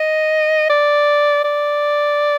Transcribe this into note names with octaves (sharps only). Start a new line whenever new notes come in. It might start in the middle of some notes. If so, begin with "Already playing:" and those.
Already playing: D#5
D5
D5